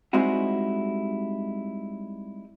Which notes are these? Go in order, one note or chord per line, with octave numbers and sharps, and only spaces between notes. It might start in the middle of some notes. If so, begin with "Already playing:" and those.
G3 G#3 C4 D#4 E4 F#4